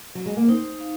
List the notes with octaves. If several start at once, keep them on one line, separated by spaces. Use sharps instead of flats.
F#3
G#3
A#3
C4 D#4
F5